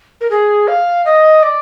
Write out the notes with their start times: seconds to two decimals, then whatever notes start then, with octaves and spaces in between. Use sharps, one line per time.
0.21 A#4
0.30 G#4
0.68 F5
1.05 D#5
1.43 D5